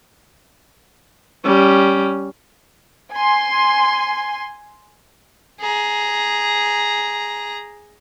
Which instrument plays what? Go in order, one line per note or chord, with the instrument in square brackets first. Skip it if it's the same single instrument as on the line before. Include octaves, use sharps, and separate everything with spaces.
[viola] G3 C#4
[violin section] G#5 C6
[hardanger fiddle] G#4 A#5